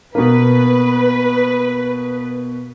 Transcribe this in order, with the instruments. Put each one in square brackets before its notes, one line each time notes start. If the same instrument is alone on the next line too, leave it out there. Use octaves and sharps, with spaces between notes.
[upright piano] B2 A#3 [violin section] B4